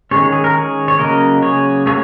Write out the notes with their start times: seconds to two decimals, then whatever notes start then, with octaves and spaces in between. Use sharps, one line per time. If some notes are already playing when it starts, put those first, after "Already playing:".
0.11 D#3 G#3 C#4 G#4 C#5
0.32 G#4
0.44 A#4
0.55 G#4 C#5
0.88 C#5
0.99 C#3 F#3 A#3 C#4 A#4 D#5
1.43 G#4 C#5
1.86 F#3 A#3 C#4 G#4 C#5